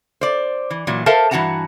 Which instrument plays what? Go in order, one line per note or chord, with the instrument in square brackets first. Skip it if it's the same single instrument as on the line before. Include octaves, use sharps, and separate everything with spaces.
[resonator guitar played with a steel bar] C5 D5
E3
A#2 E3 F#3
A4 A#4 C5 E5 F5 A5
G2 E3 F#4 F#5 A5 A#5